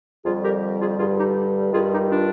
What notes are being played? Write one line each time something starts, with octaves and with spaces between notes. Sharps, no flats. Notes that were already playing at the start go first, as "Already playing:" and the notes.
F2 D3 G3 F4 G#4
G4 A#4
F4 G#4
G2 D3 G3 F4 G#4
D#4 G4
G2 D#3 G3 F4 G#4
D#4 G4
D4 F4